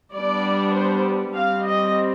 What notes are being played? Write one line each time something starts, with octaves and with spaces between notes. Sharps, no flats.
G3 B3 D4 D5
C5
G3 C4 F5
D#5